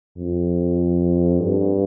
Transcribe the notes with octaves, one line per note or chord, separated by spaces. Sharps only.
F2
G2